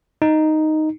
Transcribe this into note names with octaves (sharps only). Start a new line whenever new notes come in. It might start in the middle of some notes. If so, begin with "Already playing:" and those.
D#4